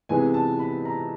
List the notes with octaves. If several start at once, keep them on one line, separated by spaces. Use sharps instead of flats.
C3 E3 G#3 B3 G#5
A5
B5
A#5